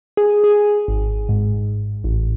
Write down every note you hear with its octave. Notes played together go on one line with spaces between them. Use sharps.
G#4
G#4
G#1
G#2
A1